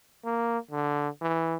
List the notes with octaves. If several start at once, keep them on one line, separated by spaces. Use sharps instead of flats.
A#3
D3
E3